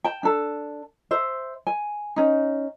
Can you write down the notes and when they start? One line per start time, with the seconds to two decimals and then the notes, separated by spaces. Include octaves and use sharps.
0.04 G5 A5
0.23 D4 A4
1.11 C5 E5
1.67 G#5
2.16 C#4 D#4